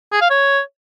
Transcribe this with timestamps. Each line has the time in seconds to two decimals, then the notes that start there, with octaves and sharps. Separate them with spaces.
0.12 G#4
0.21 F5
0.30 C#5